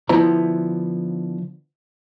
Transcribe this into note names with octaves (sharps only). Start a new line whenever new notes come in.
D3 F3 B3 E4 C5 A#5